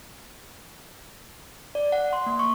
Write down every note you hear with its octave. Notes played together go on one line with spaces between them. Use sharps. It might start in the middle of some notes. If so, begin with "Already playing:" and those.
D5
F#5
C6
A#3
C#6